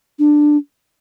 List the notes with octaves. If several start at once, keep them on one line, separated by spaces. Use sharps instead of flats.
D4